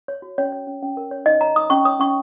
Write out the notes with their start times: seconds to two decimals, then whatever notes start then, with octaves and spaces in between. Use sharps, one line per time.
0.08 C#5
0.22 F#4
0.38 C#4 C#5
0.52 C#5
0.67 C#4
0.82 C#4
0.97 A#4
1.11 C#5
1.26 D#4 D#5
1.41 C#5 A#5
1.56 D#4 D#6
1.70 C#4 C#6
1.85 C#5 D#6
2.00 C#4 C#6